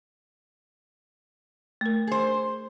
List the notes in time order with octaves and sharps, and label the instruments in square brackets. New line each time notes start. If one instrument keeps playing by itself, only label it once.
[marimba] A3 A#4
[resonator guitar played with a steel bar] G#4 C5